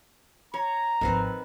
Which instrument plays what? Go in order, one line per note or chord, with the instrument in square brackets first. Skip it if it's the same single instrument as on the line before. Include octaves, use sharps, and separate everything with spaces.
[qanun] C#5 [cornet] A#5
[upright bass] G#1 F3 [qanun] D#3 C4 B4